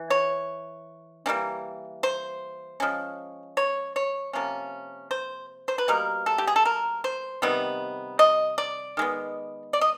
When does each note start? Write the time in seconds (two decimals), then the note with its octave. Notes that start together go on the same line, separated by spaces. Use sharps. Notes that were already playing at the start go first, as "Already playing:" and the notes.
Already playing: E3
0.10 C#5
1.26 E3 G3 A#3 C#4
2.03 C5
2.80 F3 G#3 C#4
3.57 C#5
3.96 C#5
4.33 C3 F3 A#3 C#4
5.11 C5
5.68 C5
5.78 B4
5.88 B2 G3 A#3 A#4
6.26 A4
6.38 G4
6.47 G#4
6.56 A4
6.65 A#4
7.04 C5
7.42 C3 D#3 G3 B3
8.19 D#5
8.58 D5
8.97 D#3 G#3 B3
9.73 D5
9.81 D#5